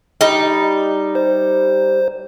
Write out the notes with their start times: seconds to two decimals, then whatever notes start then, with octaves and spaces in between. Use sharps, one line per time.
0.21 G3 D#4
1.15 C5